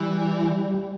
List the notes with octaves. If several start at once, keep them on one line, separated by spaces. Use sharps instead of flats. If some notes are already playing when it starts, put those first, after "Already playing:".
Already playing: E3 G3